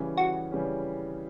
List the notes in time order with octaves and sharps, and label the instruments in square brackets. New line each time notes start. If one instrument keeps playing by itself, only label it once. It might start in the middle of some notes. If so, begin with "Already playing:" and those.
Already playing: [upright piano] C#3 E3 G3 C#4
[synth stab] F#4
[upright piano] C#3 E3 G3 C#4